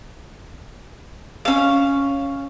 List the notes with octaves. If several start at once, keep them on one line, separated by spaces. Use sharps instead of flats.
C#4 F5